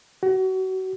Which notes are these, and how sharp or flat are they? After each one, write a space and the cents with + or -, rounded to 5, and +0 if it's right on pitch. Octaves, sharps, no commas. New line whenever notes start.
F#4 +30